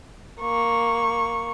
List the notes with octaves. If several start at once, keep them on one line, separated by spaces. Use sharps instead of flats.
A#3 C#6